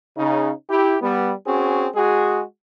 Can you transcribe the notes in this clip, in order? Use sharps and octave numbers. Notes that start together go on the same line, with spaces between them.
C#3 D#4
E4 G4
G3 B3
C4 C#4 F#4 G#4
G#3 F#4 G#4